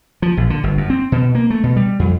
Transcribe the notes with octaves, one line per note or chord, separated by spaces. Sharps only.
F3
A#1
D3
G1
F#2
C4
B2
A#3
A3
B2
G3
F2